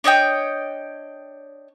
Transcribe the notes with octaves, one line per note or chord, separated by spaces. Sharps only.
D4 C#5 D#5 G5